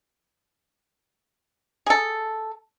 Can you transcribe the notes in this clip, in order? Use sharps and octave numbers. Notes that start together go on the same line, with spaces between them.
G#4 A4